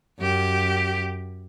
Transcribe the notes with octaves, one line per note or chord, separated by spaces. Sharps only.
F#2 G4